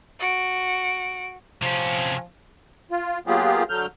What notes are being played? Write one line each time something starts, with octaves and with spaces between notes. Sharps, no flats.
F#4 D7
C3 F3 C#4
F4
F#3 A#3 B3 F4 G4 G#4
D3 F#3 F6 G6